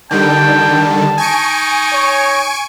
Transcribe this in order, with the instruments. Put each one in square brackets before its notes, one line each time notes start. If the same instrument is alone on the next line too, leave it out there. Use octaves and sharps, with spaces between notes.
[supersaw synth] D3 D#3 G3 [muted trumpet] G5 [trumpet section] A5
[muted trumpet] D#4 [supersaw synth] G#5 C#6 D7
[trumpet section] C#5